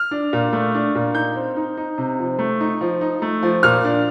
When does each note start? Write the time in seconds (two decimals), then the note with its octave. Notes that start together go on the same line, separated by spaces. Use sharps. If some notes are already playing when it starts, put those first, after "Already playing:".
Already playing: F6
0.11 D4
0.33 A#2
0.53 A3
0.74 D4
0.95 A#2
1.15 D#4 G6
1.36 C4
1.56 D#4
1.77 D#4
1.98 C3
2.19 F3
2.39 A3
2.60 D#4
2.81 F3
3.01 D#4
3.22 A3
3.43 F3
3.63 A#2 F6
3.84 D4